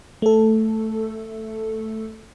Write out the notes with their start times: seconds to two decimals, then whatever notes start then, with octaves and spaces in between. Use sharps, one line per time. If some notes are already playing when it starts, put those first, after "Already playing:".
0.22 A3 A4